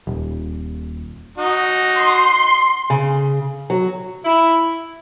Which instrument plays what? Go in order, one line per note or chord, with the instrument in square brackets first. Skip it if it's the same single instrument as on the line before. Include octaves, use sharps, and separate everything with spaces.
[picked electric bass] D#1
[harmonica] D#4 F#4
[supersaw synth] C6
[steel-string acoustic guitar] C#3
F#3
[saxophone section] E4